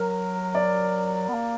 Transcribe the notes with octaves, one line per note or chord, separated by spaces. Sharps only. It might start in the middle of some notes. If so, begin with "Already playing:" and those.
Already playing: F#3 A#4
D5
B3
A#3